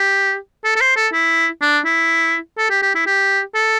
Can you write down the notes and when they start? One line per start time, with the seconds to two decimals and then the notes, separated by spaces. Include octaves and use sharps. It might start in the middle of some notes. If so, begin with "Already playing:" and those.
Already playing: G4
0.65 A4
0.76 A4
0.81 C5
0.97 A4
1.13 E4
1.62 D4
1.85 E4
2.58 A4
2.70 G4
2.83 G4
2.95 E4
3.07 G4
3.55 A4